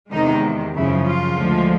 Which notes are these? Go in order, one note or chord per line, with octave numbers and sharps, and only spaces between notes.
E2 C3 D#3 G#3 D#4
F#2 C#3 F3 E4
F4
D2 D3 F3 G#3